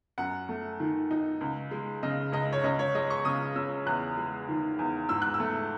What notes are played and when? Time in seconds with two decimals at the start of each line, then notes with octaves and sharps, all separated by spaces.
0.18 F#2 F#5
0.49 A3
0.80 D#3
1.11 D#4
1.41 C#2
1.71 G#3
2.03 C#3 D#5
2.32 C#2 D#5
2.53 C#5
2.64 C#2 D#5
2.79 C#5
2.95 G#3 D#5
3.10 C#6
3.25 C#3 D#6
3.56 C#4 E6
3.86 E2 F#6
4.17 G#3
4.48 D#3
4.79 E2
5.09 G#2 E6
5.22 F#6
5.34 E6
5.40 A3